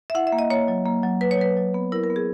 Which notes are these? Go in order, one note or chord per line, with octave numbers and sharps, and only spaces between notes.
E5
E4 F#5
E5
A#3
D#5
A#3 C#5
F#3
A#3
F#3
F#3 B4
C#5
F#3 B4
F#3
B3
E4 A#4
A#4
B3
G#4